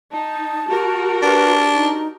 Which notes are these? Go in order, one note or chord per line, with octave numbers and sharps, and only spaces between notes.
D#4 A5
F#4 G4 A#4
D4 B4
D#4